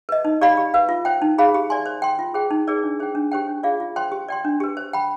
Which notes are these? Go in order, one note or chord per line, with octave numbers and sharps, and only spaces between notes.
B4 D#5
D#4
G4 D5 F5 B5
G4
B4 F5
F4
C5 G5
D#4
G#4 C5 F5 B5
G4
D5 G#5 C6
C5
G5 C6
F4
G#4 C5 G5
D#4
G#4 B4 D5
D4
G#4 C5 G5
D4
G4 C5 G5
D4
F4 G#4 D5 F5
F4
C5 G5 C6
G4
D5 G5 C6
D4
G4 B4
C5
G5 B5